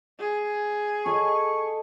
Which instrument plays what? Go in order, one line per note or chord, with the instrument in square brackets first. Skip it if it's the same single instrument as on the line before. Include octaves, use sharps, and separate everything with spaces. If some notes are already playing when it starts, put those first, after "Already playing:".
[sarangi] G#4
[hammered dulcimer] A4 D#5 [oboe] C#6